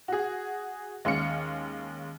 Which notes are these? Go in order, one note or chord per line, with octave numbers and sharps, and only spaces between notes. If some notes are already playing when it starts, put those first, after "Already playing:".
F#4 G#4
D#2 G#3 C#4 F5 C#7